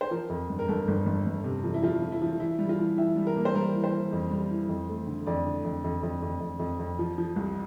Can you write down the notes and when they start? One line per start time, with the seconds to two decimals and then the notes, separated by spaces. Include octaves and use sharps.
0.01 C5
0.11 F3 A#4
0.30 F2
0.49 G1
0.59 A#4
0.68 G1 A4
0.88 G1
1.06 G1
1.26 G1
1.44 C3
1.64 F3
1.74 E4
1.83 F3 F4
2.02 F3
2.12 E4
2.22 F3
2.40 E3 E4
2.59 G3
2.69 F4
2.79 E3
2.98 E3 E5
3.16 G3
3.27 A#4
3.36 A#3
3.45 C5
3.55 G3 A#4
3.73 E3
3.84 C5
3.93 E3
4.13 F2
4.31 G3
4.51 E3
4.69 F2
4.89 A3
5.07 D3
5.27 F2 D5
5.46 D3
5.64 F2
5.84 F2
6.03 F2
6.22 F2
6.40 F2
6.59 F2
6.79 F2
6.99 F3
7.18 F3
7.36 C2